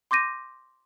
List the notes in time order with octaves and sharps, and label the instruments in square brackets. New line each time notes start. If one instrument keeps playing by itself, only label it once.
[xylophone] C6 D6 G6 A#6 D#7